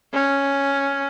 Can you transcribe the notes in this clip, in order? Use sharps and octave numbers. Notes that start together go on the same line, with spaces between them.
C#4